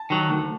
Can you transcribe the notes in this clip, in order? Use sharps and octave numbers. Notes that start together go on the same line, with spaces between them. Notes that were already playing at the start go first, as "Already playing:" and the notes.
Already playing: A5
D#3 F#3
D2